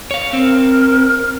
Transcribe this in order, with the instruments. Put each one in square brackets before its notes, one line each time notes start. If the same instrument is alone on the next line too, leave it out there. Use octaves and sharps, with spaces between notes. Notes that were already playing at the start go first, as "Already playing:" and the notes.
[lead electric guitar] C#5 F5
[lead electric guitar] C4 [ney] A#4